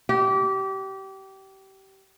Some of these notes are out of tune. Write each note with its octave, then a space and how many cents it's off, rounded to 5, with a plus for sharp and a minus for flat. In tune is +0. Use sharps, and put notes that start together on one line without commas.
G4 -25